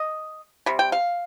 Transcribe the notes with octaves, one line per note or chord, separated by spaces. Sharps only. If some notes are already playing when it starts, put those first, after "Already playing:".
Already playing: D#5
C3 G3
G5
F5